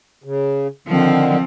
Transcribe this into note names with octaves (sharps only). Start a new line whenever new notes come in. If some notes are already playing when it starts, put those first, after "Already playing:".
C#3
D3 D#3 F3 C4